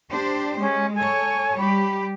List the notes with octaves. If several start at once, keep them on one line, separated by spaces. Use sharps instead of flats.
D4 G4 C5
G#3 C#4
A4 C#5 G#5
G3 G4 B5